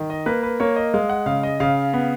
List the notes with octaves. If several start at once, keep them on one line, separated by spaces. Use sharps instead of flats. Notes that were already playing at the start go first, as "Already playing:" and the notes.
Already playing: D#3
D#5
A#3 B4
B4
A#3 C#5
D#5
G#3 F5
F#5
C#3 F5
D#5
C#3 F5
B3